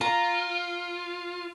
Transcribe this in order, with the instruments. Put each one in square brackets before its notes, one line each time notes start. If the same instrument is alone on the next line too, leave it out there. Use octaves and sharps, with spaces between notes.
[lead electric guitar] F4 [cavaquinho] A#5